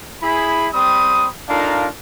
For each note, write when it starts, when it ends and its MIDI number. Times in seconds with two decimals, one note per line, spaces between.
0.23 0.68 64
0.23 0.68 68
0.23 0.68 83
0.74 1.28 55
0.74 1.28 60
0.74 1.28 83
0.74 1.28 87
1.49 1.87 62
1.49 1.87 63
1.49 1.87 65
1.49 1.87 69
1.49 1.87 70
1.49 1.87 77